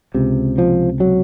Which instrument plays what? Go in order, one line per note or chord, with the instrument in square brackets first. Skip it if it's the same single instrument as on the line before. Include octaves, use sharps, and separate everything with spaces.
[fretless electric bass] C#2 C3
F3
F#3